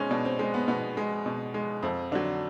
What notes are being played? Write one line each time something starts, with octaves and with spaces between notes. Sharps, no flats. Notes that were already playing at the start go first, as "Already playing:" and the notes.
Already playing: B2 G#3 C4 C#4
B2 D4
C4
G#3 C4
B3
B2 B3
G#3
B2
G#3
F2 C4
D3 F#3 D4